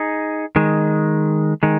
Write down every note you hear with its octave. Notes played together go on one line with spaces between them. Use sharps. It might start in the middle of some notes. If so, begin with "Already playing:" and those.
Already playing: D#4 G#4
D#3 G#3
D#3 G#3